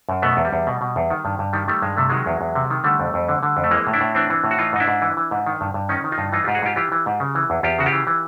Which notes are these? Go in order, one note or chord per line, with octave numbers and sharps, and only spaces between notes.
F#2
B2 A3 B3
E2
G3
E2
B2
B2
E2
D#3
G2
G2
D#3 G3
D#3 G3 A3
G2 G#3
C3 A3
D#3 F#3 G#3
E2
E2
C3
D#3
D3 G3 A3
F2
F2
D3
D3
F2
A3
E3 G#3 A#3
A2
D4 E4
A2
E3 C4 D4
E3
A2
F#4
E3 D#4 F4
G#2 D#4
D4 E4
G#2
E3
E3
G#2
D#3
G2
G2
D#3 C#4 D#4
D#3
D#4 F4
G2
E3 D#4 F4
G#2 F4 G4
F#4 G#4
G#2 F4 G4
E3 F4 G4
E3
G#2
C#3
E3
E2
E2 F4 G4
C#3 F#4
F4 G4
E3
E3